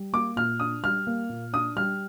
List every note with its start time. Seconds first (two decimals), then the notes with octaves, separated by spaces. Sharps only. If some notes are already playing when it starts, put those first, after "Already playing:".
Already playing: G3
0.13 A#3 D6
0.36 A#2 F6
0.60 D4 D#6
0.83 G3 F6
1.07 A#3
1.29 A#2
1.53 D4 D#6
1.76 G3 F6